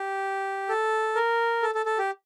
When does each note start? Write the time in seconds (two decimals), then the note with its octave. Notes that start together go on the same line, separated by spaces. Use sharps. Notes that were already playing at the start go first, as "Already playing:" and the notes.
Already playing: G4
0.69 A4
1.15 A#4
1.63 A4
1.75 A4
1.86 A4
1.98 G4